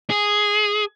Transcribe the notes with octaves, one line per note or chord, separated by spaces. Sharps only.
G#4